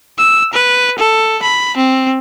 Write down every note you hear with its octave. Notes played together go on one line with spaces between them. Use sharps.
E6
B4
A4
B5
C4